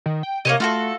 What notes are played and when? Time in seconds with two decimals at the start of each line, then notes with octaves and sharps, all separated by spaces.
0.06 D#3
0.23 G5
0.45 C3 A#3 C#5 D#5
0.60 A3 F4 F#4 A4